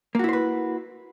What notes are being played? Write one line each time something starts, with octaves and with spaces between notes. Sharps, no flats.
A#3 E4 F#4 B4 C5